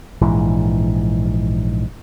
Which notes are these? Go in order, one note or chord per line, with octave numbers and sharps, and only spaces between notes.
A#1 G#2 E3